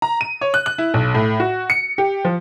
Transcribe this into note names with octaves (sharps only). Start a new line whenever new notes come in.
A#5
D#7
C#5
F#6
F#6
E4
B1
A2
F#4
C#7
G4
F3